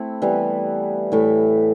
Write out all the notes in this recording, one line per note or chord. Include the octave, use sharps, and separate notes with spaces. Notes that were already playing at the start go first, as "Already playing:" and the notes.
Already playing: A3 C4 E4
E3 G3 B3
A2 E3 A3